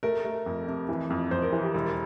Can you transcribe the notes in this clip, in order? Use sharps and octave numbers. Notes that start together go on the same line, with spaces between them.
A3 A#4
A3
F2
C3
E3
F2
F2 C5
A#4
E3
G4
E1